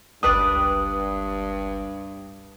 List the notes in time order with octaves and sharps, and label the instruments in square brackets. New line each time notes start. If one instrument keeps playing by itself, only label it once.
[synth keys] G1 C#2 G5 [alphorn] G2 [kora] D4 B4 D5 [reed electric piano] D#6